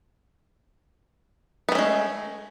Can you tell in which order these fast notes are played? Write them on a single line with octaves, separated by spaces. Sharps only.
B3 A3 C#4 G#3